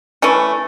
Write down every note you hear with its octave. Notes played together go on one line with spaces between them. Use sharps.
E3 A3 C#4